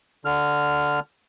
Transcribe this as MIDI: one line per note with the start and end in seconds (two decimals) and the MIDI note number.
0.25 1.00 50
0.25 1.00 89